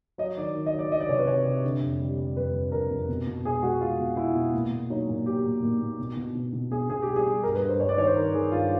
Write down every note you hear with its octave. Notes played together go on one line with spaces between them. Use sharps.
F#3 D#5
D#3 D5
D#3
D#5
F#3
D5
F#3 D#5
D5
C3 C#5
B4
C3 C#5
C3
D3
F2
G3
G3
F2 B4
F2
F2 A#4
F2
B2
B2
G#3 G#4
G#3 F#4
G#3 F4
B2
G#3 E4
B2
A#2
A#2
F#3 D#4
A#2
F#3 G4
A#2
A#2
A#2
B2
B2
B2
B2
B2 G#4
B2 G#4
G4
G3
G#4
G3
G2 A#4
B4
G2
C5
G2 C#5
D5
D#3 C#5
C5
D#3 A#4
D#3 G#4
G2 F4